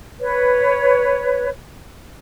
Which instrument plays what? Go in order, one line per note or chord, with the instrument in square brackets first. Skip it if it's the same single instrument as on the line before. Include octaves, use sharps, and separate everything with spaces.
[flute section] B4 C#5